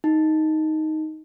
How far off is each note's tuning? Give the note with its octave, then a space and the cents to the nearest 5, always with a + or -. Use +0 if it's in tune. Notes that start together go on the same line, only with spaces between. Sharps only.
D#4 +5